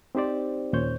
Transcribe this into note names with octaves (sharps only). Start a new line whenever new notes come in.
C4 D#4 G4 C5 D5
D#2 A#2 C#4 C5 C#5 G6